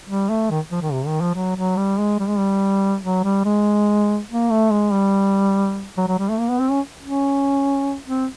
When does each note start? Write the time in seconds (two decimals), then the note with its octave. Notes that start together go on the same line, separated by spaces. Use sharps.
0.08 G3
0.29 A3
0.50 D#3
0.71 F3
0.82 D#3
0.92 C3
1.07 D#3
1.21 F3
1.35 F#3
1.56 F#3
1.77 G3
1.98 G#3
2.19 G3
2.28 G#3
2.38 G3
3.03 F#3
3.23 G3
3.45 G#3
4.30 A#3
4.50 A3
4.71 G#3
4.92 G3
5.97 F#3
6.08 F#3
6.18 G3
6.29 A3
6.39 A#3
6.49 B3
6.60 C4
6.71 C#4
7.02 C#4
8.08 C4